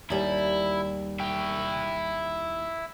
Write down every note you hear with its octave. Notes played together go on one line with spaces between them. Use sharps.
D#2 G3 E4
E4 G5